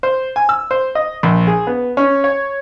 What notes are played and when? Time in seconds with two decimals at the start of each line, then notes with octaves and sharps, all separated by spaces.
0.03 C5
0.36 G#5
0.49 E6
0.71 C5
0.95 D#5
1.23 A#1
1.47 G#4
1.67 B3
1.97 C#4
2.24 C#5